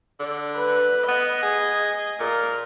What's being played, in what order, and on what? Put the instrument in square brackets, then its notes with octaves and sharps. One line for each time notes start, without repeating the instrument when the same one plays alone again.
[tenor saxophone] D3
[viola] B4
[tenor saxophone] B3 [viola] D#5
[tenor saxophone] G#4
[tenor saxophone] A#2 [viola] A#4